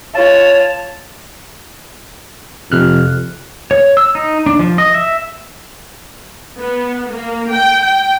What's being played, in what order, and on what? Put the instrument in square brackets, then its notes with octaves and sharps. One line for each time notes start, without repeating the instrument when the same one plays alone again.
[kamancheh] F4 [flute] C#5 [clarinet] A5
[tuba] F2 [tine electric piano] C3 F6 F#6
[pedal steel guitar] C#5
E6
D#4
D4
F3
D#5
E5
[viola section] B3
A#3
G5
G5